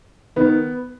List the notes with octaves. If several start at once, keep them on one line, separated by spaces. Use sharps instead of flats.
D#3 B3